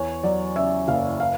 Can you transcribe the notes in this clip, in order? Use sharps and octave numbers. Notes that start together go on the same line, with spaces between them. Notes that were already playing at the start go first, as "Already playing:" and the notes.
Already playing: E2 C#5
F#3 D5
C#3 E5
F#1 F5
F5